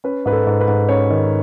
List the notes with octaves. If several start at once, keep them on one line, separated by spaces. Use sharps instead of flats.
C#4 B4
G#2 B4
A4
G#2
B4
G#2
C#4 C#5
D#3